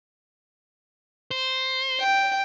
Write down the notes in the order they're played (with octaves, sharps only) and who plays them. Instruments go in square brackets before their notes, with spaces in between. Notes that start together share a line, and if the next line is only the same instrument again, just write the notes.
[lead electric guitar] C5
[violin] G5